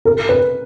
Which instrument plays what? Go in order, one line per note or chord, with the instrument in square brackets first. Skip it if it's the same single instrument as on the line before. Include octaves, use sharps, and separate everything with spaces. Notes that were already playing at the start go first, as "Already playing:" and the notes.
[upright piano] A#4
B4